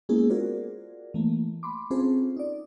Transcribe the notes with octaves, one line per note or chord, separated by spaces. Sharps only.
G#3 A#3 B3 C#4 E4 G#4
F4 F#4 G#4 A#4 C5 D5
E3 A3 A#3
B5 C6 D6
C4 C#4 F4 G#4 A4 C5
D#4 D5